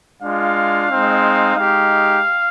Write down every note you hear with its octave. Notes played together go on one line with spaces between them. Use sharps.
G#3 D4 F4 F5
G#3 C4 D#4
G#3 D#4 G4 F5